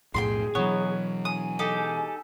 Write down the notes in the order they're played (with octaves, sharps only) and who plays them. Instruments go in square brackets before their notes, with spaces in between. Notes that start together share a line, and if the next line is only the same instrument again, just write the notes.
[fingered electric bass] B1 F2 A2 [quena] G#4 [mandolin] G5 B5 C6
[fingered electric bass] B2 E3 [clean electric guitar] F#3 C#5 [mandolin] B3
[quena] G#5 [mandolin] D#6
[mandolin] D#4 G4 A4